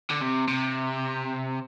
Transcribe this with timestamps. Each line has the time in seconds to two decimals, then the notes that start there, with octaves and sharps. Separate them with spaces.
0.11 D3
0.22 C3
0.48 C3